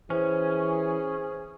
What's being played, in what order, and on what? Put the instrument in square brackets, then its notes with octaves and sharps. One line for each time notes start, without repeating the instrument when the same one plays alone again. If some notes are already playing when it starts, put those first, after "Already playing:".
[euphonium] E3 [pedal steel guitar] C#4 [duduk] G#4 [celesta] C5